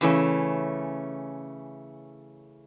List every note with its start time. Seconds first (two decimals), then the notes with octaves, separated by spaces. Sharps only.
0.01 C#3 E3 A3 C#4